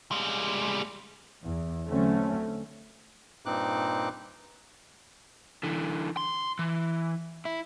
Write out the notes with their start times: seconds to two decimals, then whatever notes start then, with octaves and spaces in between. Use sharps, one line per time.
0.11 G3 G#3
1.43 E2
1.86 D3 F#3 A3 C4 C#4
3.46 G2 A#2 C4 D#4 D6 F#6
5.63 D3 E3
6.17 C6
6.59 E3
7.45 E4